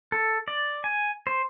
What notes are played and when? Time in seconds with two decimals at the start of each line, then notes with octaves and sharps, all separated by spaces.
0.12 A4
0.48 D5
0.84 G#5
1.27 C5